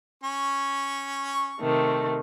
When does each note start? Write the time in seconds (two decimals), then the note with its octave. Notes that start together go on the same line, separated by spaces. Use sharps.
0.23 C#4 C#6
1.59 C3 D#3 A3